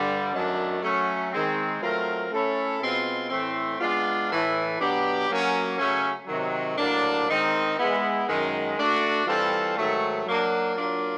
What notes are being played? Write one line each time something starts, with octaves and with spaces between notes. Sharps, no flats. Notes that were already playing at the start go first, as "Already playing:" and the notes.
Already playing: G2 D3 G3
F#2 D#3 F#3 A3 D4
F#3 A3 C#4
D#3 G#3 C4
F#3 A3 C4 F4 A#4
A3 C#4 E4 A4 C#5
B2 G#3 C4 F4
A2 E3 A3 C4
G#3 B3 D4 F4
A2 E3 A3
B2 F#3 B3 D4 G4
F#3 A#3 C#4
C#3 F#3 A3 C#4
C3 D#3 F#3
A2 F#3 A#3 D4
D#3 G#3 C4 D#4
G#3 B3 E4
F#2 D#3 G#3
A3 D4 F#4
E3 G3 C4 F4 A4
G#2 D#3 F#3 A3
F#3 A#3 D4
F#3 A#3 D4 F4